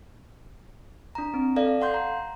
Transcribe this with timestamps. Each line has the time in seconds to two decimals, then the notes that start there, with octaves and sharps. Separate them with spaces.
1.15 D4 A#5
1.34 C4
1.56 A4 D5 F5
1.81 F5 F#5 C6 G6
1.94 A#5